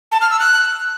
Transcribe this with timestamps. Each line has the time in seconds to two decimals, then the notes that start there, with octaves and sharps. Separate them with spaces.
0.12 A5
0.21 F6
0.30 E6
0.40 F#6